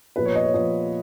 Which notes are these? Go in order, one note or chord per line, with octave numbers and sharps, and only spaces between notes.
A#2 F3 B3 B4
C#5
D#5
C#5
A#2 F3 B3 D#5